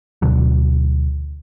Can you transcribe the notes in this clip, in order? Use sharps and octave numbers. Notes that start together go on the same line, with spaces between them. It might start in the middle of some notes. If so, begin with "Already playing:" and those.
D2 B2 D3 F#3